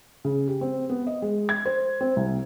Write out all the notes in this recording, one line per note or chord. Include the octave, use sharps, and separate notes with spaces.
C#3
G4
C4
B3
D#5
G#3
G#6
C5
C4
C2